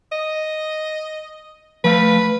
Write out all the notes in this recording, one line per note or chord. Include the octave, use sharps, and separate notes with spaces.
D#5
F3 A3 B4 F5